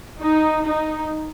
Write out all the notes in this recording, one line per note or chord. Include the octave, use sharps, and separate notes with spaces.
D#4
D#4